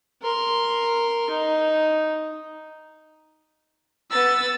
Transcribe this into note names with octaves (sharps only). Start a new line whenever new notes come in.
A#4 C6
D#4
B3 E6 A6